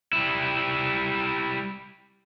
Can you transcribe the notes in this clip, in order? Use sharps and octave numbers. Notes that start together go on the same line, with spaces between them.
G3 E4